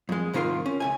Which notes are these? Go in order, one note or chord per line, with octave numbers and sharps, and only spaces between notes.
F2 G#3
C2 G#2 D#3 F4 A#4 C6
C#4
C#2 A#2 G#5